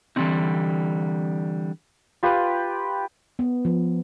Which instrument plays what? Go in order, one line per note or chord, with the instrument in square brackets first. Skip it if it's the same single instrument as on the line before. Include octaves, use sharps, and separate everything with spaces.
[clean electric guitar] D3 E3 G3 A#3 C4 D#4
[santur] F4 G4 B4
[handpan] B3
F3